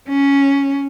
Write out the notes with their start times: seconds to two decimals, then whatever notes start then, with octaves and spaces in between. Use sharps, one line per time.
0.09 C#4